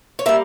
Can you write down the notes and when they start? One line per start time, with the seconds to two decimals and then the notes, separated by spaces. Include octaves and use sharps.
0.19 C#5
0.26 G3 A#3 E5